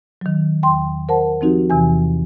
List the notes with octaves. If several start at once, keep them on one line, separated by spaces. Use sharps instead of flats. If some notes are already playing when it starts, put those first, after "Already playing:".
D#3 F#3
E2 G5 C6
A#4 C5 F#5 A5
F3 C4 D#4 F#4 G4
E2 C3 E3 G#5